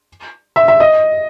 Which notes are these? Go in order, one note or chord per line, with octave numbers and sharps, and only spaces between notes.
E5
E5
D#5